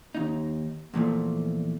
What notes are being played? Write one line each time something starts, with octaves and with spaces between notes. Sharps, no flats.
D#2 D#4
E2 A#2 F3 A3